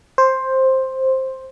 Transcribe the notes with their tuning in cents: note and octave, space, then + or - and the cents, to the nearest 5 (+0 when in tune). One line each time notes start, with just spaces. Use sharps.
C5 +10